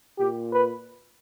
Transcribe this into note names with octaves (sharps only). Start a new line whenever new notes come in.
A#2 G4
B4